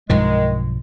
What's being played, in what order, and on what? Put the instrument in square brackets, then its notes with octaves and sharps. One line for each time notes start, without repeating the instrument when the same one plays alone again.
[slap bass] B1 G2 F3 [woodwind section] D#3 G#3